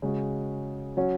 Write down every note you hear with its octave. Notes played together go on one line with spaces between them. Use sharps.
C#3 G#3 F#4
F#3 C#4 F#4